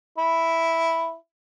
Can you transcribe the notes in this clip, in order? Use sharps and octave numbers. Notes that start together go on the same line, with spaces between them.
E4